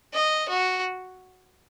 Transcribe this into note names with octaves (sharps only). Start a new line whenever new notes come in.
D#5
F#4